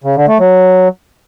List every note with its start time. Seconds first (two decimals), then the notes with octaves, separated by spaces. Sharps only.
0.04 C#3
0.16 D3
0.28 A3
0.40 F#3